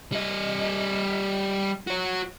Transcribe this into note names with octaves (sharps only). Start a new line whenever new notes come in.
G3 D#5
F#4 C#5